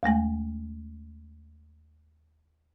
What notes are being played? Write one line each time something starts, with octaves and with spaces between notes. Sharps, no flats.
D#2 G#3 A3 G#5